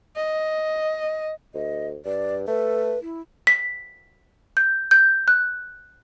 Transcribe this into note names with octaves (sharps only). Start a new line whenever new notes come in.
D#5
D2 D#5
G2 D5
A3 A4 B4
E4
B6
G6
G6
F#6